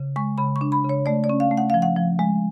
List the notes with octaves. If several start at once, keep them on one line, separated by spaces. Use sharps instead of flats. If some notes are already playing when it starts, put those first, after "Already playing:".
Already playing: C#3
G#3 C#6
C#3 B5
C#6
D4
B5
C#3
C#5
A3 D5
D5
C#4
F5
A3
F#5
F3 F5
F#5
F3
G#3